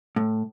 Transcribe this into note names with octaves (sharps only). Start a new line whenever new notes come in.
A2